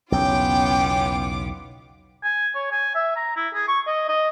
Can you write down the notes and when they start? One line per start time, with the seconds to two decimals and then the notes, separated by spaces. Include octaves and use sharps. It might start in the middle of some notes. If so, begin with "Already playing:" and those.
0.12 B1 E2 C#3 B3 C#4 F4 G5 D6
2.23 G#5
2.55 C#5
2.71 G#5
2.95 E5
3.16 A#5
3.36 E4
3.54 G#4
3.68 C#6
3.87 D#5
4.08 D#5